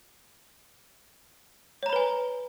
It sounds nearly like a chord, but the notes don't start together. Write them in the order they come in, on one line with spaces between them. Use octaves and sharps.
C#5 A#5 B5 B4 G#5